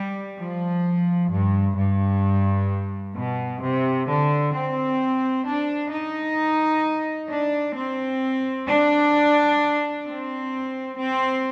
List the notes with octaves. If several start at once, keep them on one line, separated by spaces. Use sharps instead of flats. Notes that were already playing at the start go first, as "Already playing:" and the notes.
Already playing: G3
F3
G2
G2
B2
C3
D3
C4
D4
D#4
D4
C4
D4
C4
C4